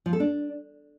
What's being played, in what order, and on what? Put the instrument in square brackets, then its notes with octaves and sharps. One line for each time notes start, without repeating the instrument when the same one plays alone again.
[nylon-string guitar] F3
A4
D4